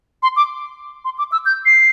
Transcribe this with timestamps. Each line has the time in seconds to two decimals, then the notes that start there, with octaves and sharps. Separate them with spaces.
0.23 C6
0.36 D6
1.05 C6
1.18 D6
1.32 E6
1.46 G6
1.66 C7